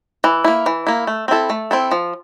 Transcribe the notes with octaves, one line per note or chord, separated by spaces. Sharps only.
E3
A#3 E4
E3
A#3 E4
A3
C4 E4 A4
A3
C4 E4 A4
F3